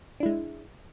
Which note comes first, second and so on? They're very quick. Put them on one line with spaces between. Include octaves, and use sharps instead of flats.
D4 E4 G#3